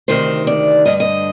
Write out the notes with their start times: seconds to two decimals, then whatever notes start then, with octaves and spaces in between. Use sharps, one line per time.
0.08 D2 C3 D#3 C5
0.47 D5
0.85 G2 D3 D#5
1.00 D#5